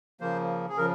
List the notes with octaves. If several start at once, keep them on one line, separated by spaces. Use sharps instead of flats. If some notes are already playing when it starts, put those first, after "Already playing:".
C#3 F3 A#3 C5
G#4
C#3 F3 A#4